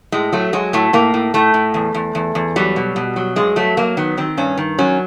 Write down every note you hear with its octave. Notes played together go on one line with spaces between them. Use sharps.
A2 G#3
F#3 A3
F#3 G#3
A2 A3
A2 A#3
A2
A2 A3
A2
E2
E2
E2
E2
F#3 G3
B2
B2
F#3
G2 G#3
F#3 A3
F#3 A#3
D#3 B3
D#3 C4
G2 C#4
D#3
F#3 C#4